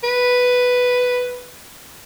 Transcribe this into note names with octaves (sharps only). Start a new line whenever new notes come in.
B4